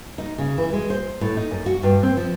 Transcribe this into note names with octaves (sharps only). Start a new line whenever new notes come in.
D#4
C#3
E3
G#3
C5
A2
D#4
F#2
F#4
G2
C4
F3